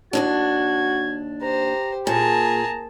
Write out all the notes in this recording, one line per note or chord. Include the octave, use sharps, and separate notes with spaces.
D#2 G#2 D4 F#4 G#6
G4 C5 A#5
A#2 G#4 A5 A#5